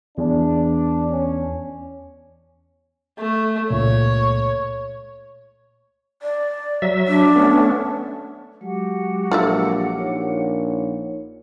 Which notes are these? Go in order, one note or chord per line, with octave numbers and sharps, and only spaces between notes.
E2 D4
C#4
A3
C#2 A#2 C#5
D5
F#3 E5
D4
A3 B3 C#4
F#3 G#3 F#4 G4 F#5
A#1 F4 A4 E5
A#1 D#4 C#5